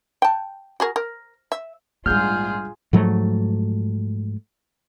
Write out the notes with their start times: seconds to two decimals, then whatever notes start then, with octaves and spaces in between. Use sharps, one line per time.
0.22 G5 A5
0.80 F#4 G#4 A#4
0.96 A#4
1.52 E5
2.06 A#1 G#2 G3 D4 F4 G#4 F6 G6
2.93 G#2 F3 F#3 A3